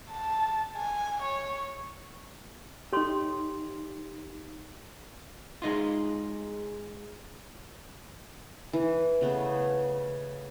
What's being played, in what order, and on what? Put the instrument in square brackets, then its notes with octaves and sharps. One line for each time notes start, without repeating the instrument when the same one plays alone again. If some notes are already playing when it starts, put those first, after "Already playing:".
[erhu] A5
G#5
C#5
[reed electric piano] D#4 G4 [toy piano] A4 C#5 C6
[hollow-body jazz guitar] G#3 D#4 F4
[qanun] E3
C#3 A3 B3